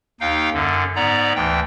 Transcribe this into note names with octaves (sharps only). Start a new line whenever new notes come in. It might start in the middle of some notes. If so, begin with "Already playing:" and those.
D#2 D#4 F5 G5
F#2 D3
G#2 B3 D5 A#5
D2 E3 G5